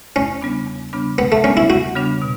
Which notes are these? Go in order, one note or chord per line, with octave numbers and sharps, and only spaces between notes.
E2 C#4
C#3 G3 B3 D4
E2
C#3 G3 B3 D4
E2 B3
A3
C#3 G3 B3 C#4 D4
E4
E2 F#4
C#3 G3 B3 D4
B2